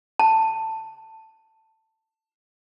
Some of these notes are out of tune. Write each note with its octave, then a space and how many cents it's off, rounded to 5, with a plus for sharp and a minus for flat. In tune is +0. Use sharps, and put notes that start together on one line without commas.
A5 +10